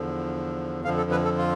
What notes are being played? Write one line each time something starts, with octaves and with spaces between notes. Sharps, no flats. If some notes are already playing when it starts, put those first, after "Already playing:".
Already playing: E2 D3 F3
F2 D3 F3 F5
A4
B4
A4
F4